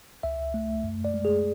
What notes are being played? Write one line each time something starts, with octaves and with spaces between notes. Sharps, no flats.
C#2 E5
A3
F#2
D5
G#3
G#4